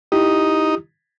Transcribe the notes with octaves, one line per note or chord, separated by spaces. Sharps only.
D#4 E4 G4